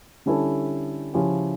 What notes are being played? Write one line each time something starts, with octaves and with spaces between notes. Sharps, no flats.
D3 G3 C#4 E4 A4
C#3 F3 C#4 E4 G4